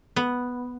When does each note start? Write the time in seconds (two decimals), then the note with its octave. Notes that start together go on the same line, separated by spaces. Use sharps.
0.16 B3